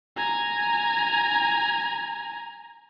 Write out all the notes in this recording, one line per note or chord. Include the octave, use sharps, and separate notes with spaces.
G#5 A#5